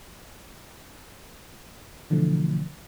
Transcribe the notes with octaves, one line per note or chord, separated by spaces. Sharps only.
B2 D3 E3 F3 A3